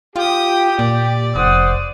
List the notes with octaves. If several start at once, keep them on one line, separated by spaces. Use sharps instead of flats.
F4 G4 G5 D#6
A#2 D5
F1 C5 F#5 D#6